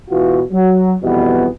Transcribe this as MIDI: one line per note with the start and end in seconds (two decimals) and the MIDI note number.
0.11 0.42 47
0.11 0.42 52
0.11 0.42 65
0.11 0.42 66
0.53 0.94 54
1.03 1.48 41
1.03 1.48 47
1.03 1.48 52
1.03 1.48 55
1.03 1.48 59